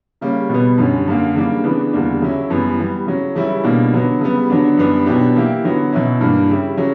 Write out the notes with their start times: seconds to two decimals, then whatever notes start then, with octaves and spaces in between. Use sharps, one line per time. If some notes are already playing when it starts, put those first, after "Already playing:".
0.21 C#3 G3 A#3 C#4
0.49 B2 G3 B3
0.78 F#2 D3 G3 C#4
1.08 F#2 D3 A#3
1.35 C#3 E3 G3 A#3 D4
1.64 C#3 E3 B3 D4
1.93 E2 D3 G3 A#3 D4
2.21 C#3 F#3 C#4 E4
2.50 F#2 E3 G3 B3
2.78 E3 G3 B3
3.06 C#3 F#3 C#4
3.35 C#3 E3 G3 C#4 E4
3.64 B2 G3 A#3 D4
3.92 D3 F#3 B3
4.21 C#3 G3 B3
4.50 D3 F#3 B3 D4
4.77 F#2 E3 G3 B3 D4
5.06 B2 F#3 B3 D4 G4
5.34 E3 A#3 E4 G4
5.64 D3 F#3 B3
5.92 B2 F#3 C#4 E4
6.21 G2 E3 A#3 D4
6.49 C#3 G3 C#4 E4 G4
6.77 C#3 F#3 C#4